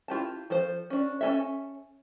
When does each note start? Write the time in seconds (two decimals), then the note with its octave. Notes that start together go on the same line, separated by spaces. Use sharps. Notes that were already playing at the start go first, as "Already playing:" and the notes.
0.08 E4 F4 G4 A5
0.50 F3 A4 C5
0.90 C#4 D4
1.21 C#4 D#4 A4 C#5 E5